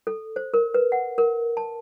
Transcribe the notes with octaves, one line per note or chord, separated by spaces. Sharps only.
A4
C5
A#4
B4
F#5
A#4
A5